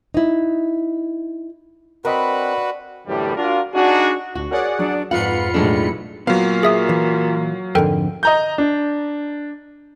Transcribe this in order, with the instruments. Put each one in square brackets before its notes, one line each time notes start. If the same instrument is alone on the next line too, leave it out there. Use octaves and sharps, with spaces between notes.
[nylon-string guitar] D#4 E4
[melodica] C4 [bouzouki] D4 [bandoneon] F#4 B4 [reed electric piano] A#4 D#5 B5
[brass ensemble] F#2 A2 D3 E3 G3
D4 F4 F#4 A#4
D4 D#4 F#4 G#4
[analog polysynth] D2 [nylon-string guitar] F#4
[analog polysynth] G#4 D5 F#5 [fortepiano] A#4 C#5
[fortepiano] F#3 [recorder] D4
[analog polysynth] F2 B5 C#7 [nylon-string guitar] G#2 B4 F#5 [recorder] F4 [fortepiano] F5
[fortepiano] B1 F#3 A3 [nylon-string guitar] A2 G#3 D4
[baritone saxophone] A#2 [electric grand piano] F#3 F5 [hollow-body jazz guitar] B3
[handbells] G#4 E5 D#6
[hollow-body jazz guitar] E3
[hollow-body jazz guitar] F2 G#2 D3 [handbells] A4 A#4 G5
[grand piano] D#5 A#5 G6
D4